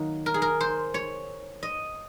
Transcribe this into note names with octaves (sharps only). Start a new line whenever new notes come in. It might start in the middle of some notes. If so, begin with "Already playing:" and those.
Already playing: D#3 F#3 A#3
A#4
G#4
A#4
C5
C#5
D#5